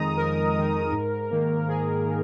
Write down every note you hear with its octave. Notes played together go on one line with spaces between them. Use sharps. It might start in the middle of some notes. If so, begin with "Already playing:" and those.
Already playing: F2 D#3 G#3 D#4 A#5 D#6
F2 A#4
D#3 G#3 D#4
G#2
D#3 A#3
G#2 G#4
D#3